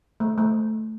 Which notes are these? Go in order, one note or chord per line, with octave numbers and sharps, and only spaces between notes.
A3
A3